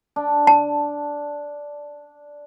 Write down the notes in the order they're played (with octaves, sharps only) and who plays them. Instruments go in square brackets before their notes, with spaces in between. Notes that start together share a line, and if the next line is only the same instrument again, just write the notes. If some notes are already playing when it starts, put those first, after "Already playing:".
[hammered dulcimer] D4
[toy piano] A5